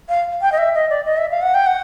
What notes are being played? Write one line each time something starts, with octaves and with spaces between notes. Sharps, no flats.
F5
G5
D#5
E5
D#5
D5
D#5
E5
F5
F#5
G5
F#5